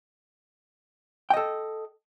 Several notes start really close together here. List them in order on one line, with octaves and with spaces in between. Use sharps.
G5 D#5 A4